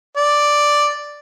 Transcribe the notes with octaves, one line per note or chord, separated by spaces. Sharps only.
D5